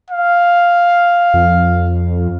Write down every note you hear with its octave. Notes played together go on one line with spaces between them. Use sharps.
F5
F2